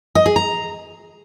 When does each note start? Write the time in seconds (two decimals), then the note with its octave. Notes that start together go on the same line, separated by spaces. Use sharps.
0.15 D#5
0.26 G#4
0.36 A#5